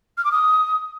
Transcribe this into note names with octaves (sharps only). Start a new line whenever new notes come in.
F6
D6
D#6